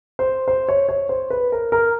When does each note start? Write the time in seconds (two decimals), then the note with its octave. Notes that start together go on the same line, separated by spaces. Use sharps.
0.19 C5
0.48 C5
0.69 C#5
0.89 C#5
1.09 C5
1.30 B4
1.52 A#4
1.72 A#4